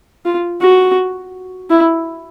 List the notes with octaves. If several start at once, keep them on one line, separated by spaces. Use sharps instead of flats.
F4
F#4
E4